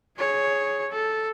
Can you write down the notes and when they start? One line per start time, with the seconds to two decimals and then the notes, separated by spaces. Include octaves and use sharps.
0.17 G#4 C#5
0.90 A4